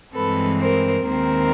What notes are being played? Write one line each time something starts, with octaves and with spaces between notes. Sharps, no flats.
G2 E3 G#3 C4 A4 B4
A#4 C5
D#2 D#3 G#3 C4 A#4 C5